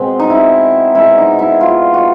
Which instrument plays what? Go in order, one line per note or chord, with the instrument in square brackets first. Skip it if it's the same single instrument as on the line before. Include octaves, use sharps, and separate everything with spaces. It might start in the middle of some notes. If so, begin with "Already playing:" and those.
Already playing: [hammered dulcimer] B2 G#3 C4
D#4
E4
B2 G#3 B3 E4
D#4
E4
F4
F#4